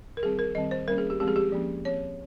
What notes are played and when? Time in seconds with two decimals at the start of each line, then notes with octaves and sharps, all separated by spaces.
0.17 A#4
0.23 D#3 G3 C4 G#4
0.39 A#4
0.55 D#3 G3 C4 D#5
0.71 C5
0.87 G3 A#3 C#4 A#4
0.98 G#4
1.10 G4
1.20 F3 G#3 C4 G4
1.28 G#4
1.36 G4
1.52 F3 A#3 C#4
1.85 F3 C4 C#5